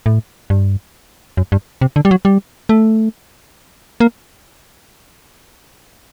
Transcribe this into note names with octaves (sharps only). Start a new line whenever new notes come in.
A2
G2
F#2
G2
C3
D3
G3
F#3
G3
A3
A#3